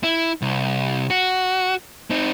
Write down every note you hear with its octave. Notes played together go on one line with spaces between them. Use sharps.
E4
C2
F#4
C4 D#4